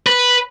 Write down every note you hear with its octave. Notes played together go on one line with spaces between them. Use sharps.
B4